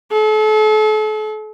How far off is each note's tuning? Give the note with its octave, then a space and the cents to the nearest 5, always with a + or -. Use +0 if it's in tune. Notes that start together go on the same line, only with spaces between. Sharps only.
A4 -40